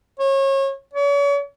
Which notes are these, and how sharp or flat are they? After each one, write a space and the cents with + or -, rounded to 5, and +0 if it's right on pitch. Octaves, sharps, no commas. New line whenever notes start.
C#5 -30
C#5 +40